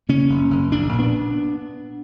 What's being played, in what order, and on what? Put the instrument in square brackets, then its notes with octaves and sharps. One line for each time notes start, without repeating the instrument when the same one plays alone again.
[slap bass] C#3 A#3 C#4
F#1
F#1
A#1 D4
A#2
B3 D4